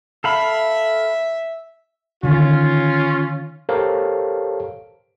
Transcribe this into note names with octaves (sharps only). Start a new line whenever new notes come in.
A4 E5 F5 B5
D3 D#3 C#4 F4
G4 A4 A#4 C5 C#5 F5